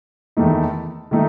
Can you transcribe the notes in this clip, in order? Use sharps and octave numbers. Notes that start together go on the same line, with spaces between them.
E2 D#3 A3 D#4
D#3 A3 D#4